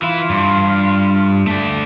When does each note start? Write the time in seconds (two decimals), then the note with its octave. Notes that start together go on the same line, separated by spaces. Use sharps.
0.02 E3 E4 F4
0.30 G2
1.47 A3 D5